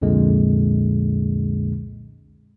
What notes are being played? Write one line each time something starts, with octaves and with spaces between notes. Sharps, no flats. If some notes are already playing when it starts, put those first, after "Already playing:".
C2 F2 A#2 D3 G#3